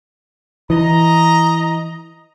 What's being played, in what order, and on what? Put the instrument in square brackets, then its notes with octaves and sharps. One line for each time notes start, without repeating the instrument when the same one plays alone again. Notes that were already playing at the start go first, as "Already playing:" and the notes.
[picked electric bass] E3 [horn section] D#5 A#5